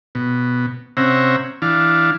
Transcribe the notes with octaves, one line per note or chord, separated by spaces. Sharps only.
B2
C3 C4 C#4 E5 F#5 A#5
E3 D4 F5